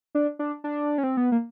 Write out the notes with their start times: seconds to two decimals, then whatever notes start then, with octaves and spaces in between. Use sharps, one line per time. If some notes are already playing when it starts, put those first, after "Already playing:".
0.15 D4
0.39 D4
0.64 D4
0.98 C#4
1.03 C4
1.17 B3
1.32 A#3